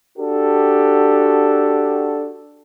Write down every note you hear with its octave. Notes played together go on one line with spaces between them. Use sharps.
D4 F#4 G4 A4